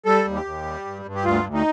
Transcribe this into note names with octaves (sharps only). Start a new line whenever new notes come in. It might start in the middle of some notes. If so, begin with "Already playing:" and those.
G3 A4
D#2
G4
D#2
G3
G2
G2
G4
D2 F4
D2
D#4